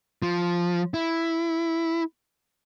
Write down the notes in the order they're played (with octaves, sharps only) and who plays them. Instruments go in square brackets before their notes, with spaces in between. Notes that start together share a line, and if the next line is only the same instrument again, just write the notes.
[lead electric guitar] F3
E4